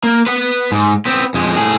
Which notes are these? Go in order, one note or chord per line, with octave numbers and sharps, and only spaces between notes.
A#3
B4 F#5
G#2
B3 C4
F2 G#3
A2 G#4